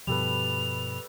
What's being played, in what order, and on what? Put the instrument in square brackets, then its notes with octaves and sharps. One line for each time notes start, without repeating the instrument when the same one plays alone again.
[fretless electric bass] G2 B2 F3 [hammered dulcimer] G3 A4 B4 [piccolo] F7